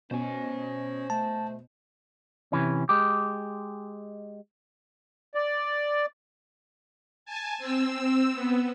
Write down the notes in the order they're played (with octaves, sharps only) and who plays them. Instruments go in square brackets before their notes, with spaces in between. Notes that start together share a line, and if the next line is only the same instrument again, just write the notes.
[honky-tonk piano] B2 [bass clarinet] C#4 [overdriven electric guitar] C5 G#5
[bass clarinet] A3 [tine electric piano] A5
[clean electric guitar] C3 E3 C#4
G#3 G4
[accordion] D5
[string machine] G#5 A5
C4 E6
B3